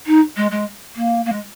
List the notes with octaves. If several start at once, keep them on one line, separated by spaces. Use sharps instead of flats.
D#4
G#3
G#3
A#3
A#3
G#3